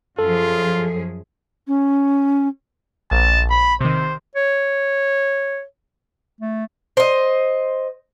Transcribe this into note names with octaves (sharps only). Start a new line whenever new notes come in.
F#2 F3 F4 G#4 A4
C#4
A#1 A5
B5
C3 D#3 C5
C#5
A3
C5 D#5